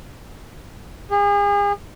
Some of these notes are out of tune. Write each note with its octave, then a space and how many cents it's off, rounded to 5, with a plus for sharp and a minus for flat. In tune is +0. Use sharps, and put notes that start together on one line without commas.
G#4 -40